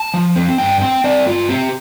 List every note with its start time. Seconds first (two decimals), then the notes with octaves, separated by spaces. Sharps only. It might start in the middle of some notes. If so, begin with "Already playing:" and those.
Already playing: A5
0.14 F3
0.36 C4
0.58 G2 G5
0.81 C4 G5
1.04 C4 D5
1.26 G2 F4
1.49 C4 G4